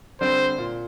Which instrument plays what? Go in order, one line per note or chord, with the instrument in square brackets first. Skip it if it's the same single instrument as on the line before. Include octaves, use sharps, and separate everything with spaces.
[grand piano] D3 G3 C4 [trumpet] C5
[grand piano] A#2